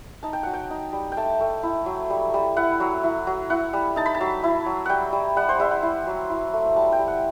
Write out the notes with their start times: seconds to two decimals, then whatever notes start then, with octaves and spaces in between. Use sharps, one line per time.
0.23 D#4 A5
0.33 G5
0.43 F#3 F#5
0.53 G5
0.71 D#4
0.93 G3
1.12 G5
1.17 A3 A5
1.41 A3
1.63 E4
1.86 F#3
2.10 G3
2.34 G3
2.56 E4 F#5
2.80 F#3
3.04 E4
3.27 F#3
3.50 E4 F#5
3.73 G3
3.96 D#4 A5
4.06 B5
4.15 A5
4.20 F#3
4.44 E4
4.66 F#3
4.86 G3 F#5 G5
5.13 G3
5.36 G3 F#5
5.49 C5
5.60 G3 E5
5.71 F#5
5.83 E4
6.07 F#3
6.30 E4
6.53 A3
6.76 G3 A5
6.92 G5
6.99 G3
7.08 F#5